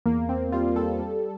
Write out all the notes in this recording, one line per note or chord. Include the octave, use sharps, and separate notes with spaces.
E2 A#3
E2 C4
G3 F4
G3 A4
G3